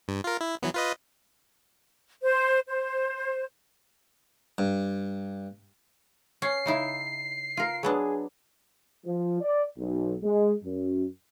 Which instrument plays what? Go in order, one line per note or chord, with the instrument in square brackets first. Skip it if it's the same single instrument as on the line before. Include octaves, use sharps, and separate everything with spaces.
[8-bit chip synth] G2
F4 A#4
E4
E3 F#3 B3
F4 B4 D#5
[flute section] C5
C5
[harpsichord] G2
[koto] C#4 [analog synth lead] C7
[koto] C#3 D#4 E4
F4 A#4
[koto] F#3 B3 D4 [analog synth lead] G#4
[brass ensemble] F3
D5
B1
G#3
F#2